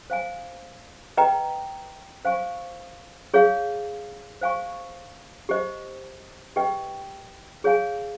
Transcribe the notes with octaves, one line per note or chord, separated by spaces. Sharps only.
C5 F5 G#5
B4 D#5 G5 A#5
C5 F5 G#5 C#6
G#4 C#5 F5
C5 F5 G#5 C#6
G4 C5 D#5
G4 B4 D#5 G5
G#4 C#5 F5 G#5